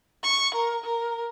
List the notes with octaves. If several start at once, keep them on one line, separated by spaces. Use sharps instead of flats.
C#6
A#4
A#4